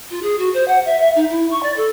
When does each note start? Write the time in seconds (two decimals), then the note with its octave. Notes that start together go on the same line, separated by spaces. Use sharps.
0.10 F4
0.22 G#4
0.38 F#4
0.54 C5
0.68 F#5
0.85 E5
1.00 E5
1.15 D#4
1.30 E4
1.51 C#6
1.63 D5
1.76 A4